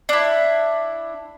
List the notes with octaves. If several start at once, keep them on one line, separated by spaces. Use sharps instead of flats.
D4 E4